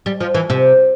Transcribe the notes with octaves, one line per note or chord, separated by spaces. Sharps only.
G3
F3
E3
C3